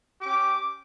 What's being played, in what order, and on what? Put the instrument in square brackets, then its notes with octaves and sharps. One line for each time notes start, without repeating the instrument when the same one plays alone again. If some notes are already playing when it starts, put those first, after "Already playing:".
[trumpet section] C#4 G4 D6